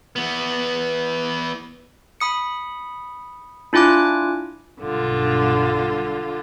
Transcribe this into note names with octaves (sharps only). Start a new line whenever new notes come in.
E3 B3
B5 D#6 C#7
D4 E4 F4 G#5 D6 F#6
B1 G2 D3 F4